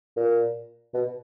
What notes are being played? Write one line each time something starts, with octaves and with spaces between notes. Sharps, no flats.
A#2
B2